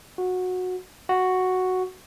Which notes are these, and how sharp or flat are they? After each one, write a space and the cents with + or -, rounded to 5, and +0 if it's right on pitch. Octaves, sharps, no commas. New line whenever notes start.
F#4 -15
F#4 +0